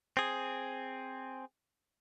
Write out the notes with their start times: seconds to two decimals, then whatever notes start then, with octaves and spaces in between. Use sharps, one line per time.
0.17 C4 G#4